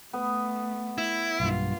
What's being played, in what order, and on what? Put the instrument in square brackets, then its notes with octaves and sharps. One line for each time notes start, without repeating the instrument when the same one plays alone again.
[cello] A3 [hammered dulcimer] B3
[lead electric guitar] E4
[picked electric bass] B1 G2 [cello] A#3 F4